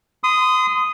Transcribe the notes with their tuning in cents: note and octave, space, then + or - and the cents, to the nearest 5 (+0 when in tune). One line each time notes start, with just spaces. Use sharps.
C6 -35 D#6 +0